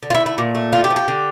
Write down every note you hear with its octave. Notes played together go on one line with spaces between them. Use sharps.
D3
F4
E4
A3
E4
A#2
A3
D3 F4
G4
F3
G4
D3